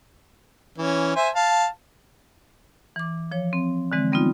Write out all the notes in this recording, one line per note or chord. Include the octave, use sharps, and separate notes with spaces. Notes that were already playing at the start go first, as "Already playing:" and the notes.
E3 C#4
C5 E5 G#5
F5 A5
E3 D6
F3 C#5
C4
D3 E3 G#3 C4
G3 B3 C4 D#4 F4